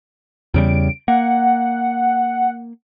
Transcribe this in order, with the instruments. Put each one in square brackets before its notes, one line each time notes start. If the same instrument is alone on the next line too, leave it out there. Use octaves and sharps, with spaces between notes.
[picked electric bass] E2 C#3 G3 [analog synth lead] D7
[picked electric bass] A#3 [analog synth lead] F#5